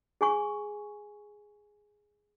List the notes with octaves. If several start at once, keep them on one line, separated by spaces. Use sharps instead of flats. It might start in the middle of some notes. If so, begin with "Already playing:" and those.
G#4 G#5 C#6